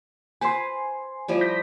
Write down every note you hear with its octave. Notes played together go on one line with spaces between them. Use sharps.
B4 C5 G#5 C6
F3 G3 E4
G6 A#6 B6